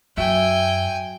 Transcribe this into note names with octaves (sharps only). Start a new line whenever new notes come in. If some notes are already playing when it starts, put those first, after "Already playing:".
F#2 F#4 A4 E5 G5 G#5